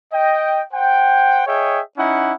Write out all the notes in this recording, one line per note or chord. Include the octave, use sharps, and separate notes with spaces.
D#5 G5
C5 F#5 G5
G#4 C#5 D#5 E5 G5
C#4 D#4 E4 F#5